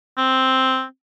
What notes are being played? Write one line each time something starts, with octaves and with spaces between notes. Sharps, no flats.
C4